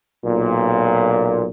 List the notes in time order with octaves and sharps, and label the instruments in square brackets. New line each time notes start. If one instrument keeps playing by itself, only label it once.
[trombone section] B1 A#2